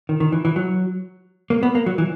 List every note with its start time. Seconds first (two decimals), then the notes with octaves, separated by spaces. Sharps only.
0.09 D#3
0.20 D#3
0.32 E3
0.45 E3
0.56 F#3
1.50 A#3
1.63 B3
1.75 A#3
1.86 F#3
1.98 E3